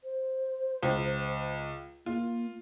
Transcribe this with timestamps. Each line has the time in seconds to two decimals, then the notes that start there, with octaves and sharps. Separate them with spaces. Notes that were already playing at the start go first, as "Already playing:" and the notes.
0.04 C5
0.83 C#2
2.06 A#3 F4